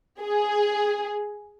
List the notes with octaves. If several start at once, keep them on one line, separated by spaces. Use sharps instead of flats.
G#4